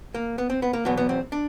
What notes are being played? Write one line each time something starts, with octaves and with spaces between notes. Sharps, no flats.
A#3
B3
C4
B3
A#3
E2 B2 F#3 B3
B3
C4
D4